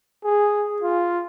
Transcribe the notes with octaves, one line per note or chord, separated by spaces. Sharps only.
G#4
F4